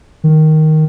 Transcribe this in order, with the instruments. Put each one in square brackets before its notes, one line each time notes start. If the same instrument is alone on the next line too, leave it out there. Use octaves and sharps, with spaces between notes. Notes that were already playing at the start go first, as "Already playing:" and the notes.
[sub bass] D#3